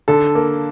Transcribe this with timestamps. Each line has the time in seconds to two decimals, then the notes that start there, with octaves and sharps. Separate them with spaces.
0.08 D3 A4
0.35 A#3